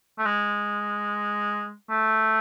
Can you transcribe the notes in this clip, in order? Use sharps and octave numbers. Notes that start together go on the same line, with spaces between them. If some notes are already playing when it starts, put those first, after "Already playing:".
A3
G#3
A3